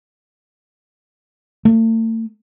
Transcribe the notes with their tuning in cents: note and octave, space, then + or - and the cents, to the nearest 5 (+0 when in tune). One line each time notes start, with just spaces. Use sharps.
A3 +40